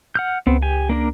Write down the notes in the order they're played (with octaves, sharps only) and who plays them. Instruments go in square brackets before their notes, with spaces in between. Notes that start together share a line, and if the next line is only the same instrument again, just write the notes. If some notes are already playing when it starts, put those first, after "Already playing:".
[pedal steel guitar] F#5 F6 G6
[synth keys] C#2 [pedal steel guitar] B3 C4
[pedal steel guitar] G4 G#5
A#3 D4 A#4